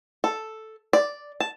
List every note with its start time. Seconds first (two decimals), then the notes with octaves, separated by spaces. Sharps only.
0.24 A4
0.93 D5
1.40 A5